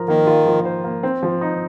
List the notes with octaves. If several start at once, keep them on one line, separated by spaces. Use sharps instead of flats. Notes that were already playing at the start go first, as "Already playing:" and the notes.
Already playing: F3 F4 A#4
D#3 A#3
F4
F3
C5
A#3
C4
F3
D#4